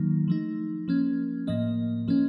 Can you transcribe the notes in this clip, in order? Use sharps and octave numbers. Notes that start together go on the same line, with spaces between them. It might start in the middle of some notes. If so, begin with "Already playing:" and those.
Already playing: D#3 F#3 A#3 D#4
F3 A3 D#4
F3 A#3 C#4
A2 F3 A#3 D#5
F3 A#3 C#4